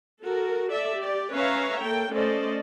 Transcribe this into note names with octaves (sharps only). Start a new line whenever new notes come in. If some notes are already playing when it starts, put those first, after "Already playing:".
F#4 A4 A#4
A4 D5 E5
G4 D5
C#4 B4 C#5 E5 F5 A#5
A#3 A4 G5
A3 C#4 A4 C5 D5 D#5